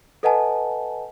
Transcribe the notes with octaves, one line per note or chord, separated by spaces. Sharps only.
A4 B4 D#5 F#5 G#5 A5